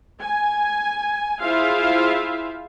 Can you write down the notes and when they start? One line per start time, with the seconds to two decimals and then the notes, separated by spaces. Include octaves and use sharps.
0.22 G#5
1.41 E4 F4 G#4 C5 E5 F5